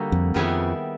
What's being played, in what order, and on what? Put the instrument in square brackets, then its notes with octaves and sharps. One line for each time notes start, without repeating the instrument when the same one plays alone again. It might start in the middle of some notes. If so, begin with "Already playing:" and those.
Already playing: [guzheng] D3 G3 A#3 D#4 F#4
[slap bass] F2
[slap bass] F2 [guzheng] D#3 G3 B3 E4 G#4